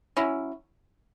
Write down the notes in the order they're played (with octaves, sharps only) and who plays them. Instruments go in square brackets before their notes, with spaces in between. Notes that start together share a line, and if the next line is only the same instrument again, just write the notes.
[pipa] F#3 C#4 E4